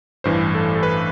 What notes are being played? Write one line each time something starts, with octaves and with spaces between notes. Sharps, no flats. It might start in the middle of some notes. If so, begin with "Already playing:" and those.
A1 G2 E3 C5
A4
A4
B4